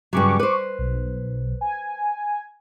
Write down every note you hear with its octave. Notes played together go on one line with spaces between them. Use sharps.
G2 C#3 F#3 C#6 D6
B4 C5
B1
G#5